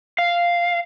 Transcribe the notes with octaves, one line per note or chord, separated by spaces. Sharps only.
F5